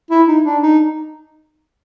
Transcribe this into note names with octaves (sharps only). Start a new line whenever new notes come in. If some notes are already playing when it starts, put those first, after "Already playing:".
E4
D#4
D4
D#4